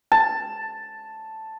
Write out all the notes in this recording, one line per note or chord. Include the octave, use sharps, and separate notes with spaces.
A5